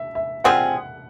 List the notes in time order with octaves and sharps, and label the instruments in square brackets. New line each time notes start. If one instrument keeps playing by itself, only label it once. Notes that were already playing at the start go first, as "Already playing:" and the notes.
Already playing: [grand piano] E5
E5
[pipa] G3 C4 F4 G#4 [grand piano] F#5